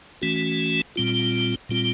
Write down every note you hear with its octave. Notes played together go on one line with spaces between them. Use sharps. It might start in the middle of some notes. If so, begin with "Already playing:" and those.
E3 A3 C#4 F#4
A#2 G3 C4 F4
A#2 G3 C4 F4